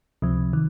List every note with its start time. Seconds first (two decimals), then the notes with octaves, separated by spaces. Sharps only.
0.22 C#2 C3 F3
0.53 D#3